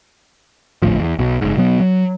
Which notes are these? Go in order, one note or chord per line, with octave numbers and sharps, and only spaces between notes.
G#1 D2 A2 F3
E2
B1 B2
F#1 G#2
B2 F#3 B3
F#3